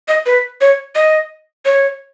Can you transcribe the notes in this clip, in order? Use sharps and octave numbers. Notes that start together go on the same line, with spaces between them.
D#5
B4
C#5
D#5
C#5